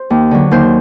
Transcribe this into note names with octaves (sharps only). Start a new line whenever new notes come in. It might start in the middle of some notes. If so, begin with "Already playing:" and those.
Already playing: C5
D#2
D3 F#3
D#2 C5